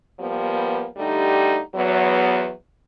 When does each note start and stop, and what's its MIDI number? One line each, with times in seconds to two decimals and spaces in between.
0.20 0.86 53
0.20 0.86 55
0.20 0.86 58
0.20 0.86 59
0.97 1.59 50
0.97 1.59 55
0.97 1.59 57
0.97 1.59 63
0.97 1.59 67
1.74 2.51 40
1.74 2.51 54
1.74 2.51 59